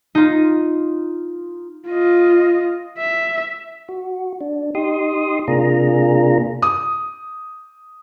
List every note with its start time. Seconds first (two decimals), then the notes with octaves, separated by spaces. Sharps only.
0.15 D#4 F4
1.88 F4 D#5
2.98 E5
3.89 F#4
4.41 D4
4.75 D#4 G4 C6 D#6
5.48 C3 A#3 D4 F4 G#4 A#5
6.62 D#6